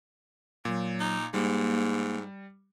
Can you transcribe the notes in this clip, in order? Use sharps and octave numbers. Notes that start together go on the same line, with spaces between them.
A#2 F#3
D#4
G#2 G3 A#3